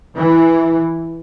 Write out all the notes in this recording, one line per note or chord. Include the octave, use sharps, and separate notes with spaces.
E3